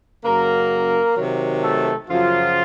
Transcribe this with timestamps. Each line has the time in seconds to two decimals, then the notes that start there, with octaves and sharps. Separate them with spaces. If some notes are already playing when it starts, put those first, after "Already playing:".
0.23 F#2 C#3 F#3 A#3 A#4
1.16 C3 D#3 F#3
1.62 A3 A4
2.09 F#2 C#3 F3 F#3 F4